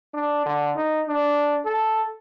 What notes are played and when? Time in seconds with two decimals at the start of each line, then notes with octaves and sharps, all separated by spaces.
0.14 D4
0.46 D3
0.76 D#4
1.07 D4
1.65 A4